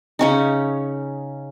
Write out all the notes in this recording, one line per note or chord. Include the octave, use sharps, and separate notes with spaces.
C#3 C#4 D#4